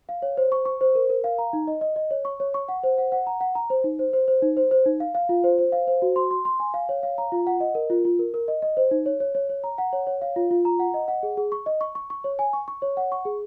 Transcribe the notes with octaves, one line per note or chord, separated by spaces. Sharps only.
F5
C#5
C5
C#6
C#6
C5
A#4
A#4
F5
A#5
D#4
D#5
D#5
D#5
C#5
C#6
C#5
C#6
F#5
C5
F#5
F#5
A#5
F#5
A#5
C5
D#4
C5
C5
C5
D#4
C5
C5
D#4
F5
F5
F4
C5
C5
F5
C5
F#4
C6
C6
C6
G#5
F5
C#5
F5
A#5
F4
F#5
D#5
A#4
F4
F4
A#4
A#4
D#5
D#5
C5
D#4
C#5
C#5
C#5
C#5
A#5
F#5
C#5
C#5
F5
F4
F4
A#5
F#5
D#5
F#5
G#4
G#4
C#6
D#5
C#6
C#6
C#6
C#5
G#5
C#6
C#6
C#5
F#5
C#6
G#4